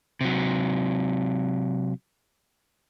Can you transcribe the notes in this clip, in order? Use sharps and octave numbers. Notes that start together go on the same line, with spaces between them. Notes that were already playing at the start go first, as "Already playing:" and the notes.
C3 F#3